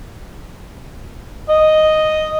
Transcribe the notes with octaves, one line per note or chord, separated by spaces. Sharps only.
D#5